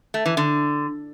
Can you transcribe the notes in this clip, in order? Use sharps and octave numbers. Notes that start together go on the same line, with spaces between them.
A3
E3
D3